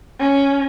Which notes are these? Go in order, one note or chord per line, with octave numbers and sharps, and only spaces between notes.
C#4